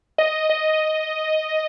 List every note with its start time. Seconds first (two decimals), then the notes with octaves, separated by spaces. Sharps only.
0.18 D#5
0.50 D#5